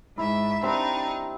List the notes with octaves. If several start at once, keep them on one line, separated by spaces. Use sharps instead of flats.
G#2 E4 E5
G3 C4 D4 D#4